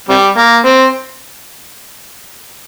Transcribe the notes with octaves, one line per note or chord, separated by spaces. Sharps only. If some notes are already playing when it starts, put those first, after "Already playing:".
C3 G3
A#3
C4